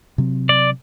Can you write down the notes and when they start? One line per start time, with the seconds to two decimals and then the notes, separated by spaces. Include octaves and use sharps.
0.18 C3 F#3 C4
0.49 D5